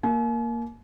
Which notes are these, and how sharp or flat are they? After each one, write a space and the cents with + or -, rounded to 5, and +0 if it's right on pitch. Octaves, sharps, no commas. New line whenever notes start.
A#3 +0 G#5 +45